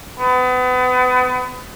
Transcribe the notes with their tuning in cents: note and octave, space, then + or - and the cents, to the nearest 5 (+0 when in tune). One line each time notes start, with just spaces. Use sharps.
B3 +35